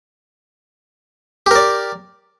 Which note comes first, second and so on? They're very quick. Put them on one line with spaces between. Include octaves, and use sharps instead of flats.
G4 A#4 D5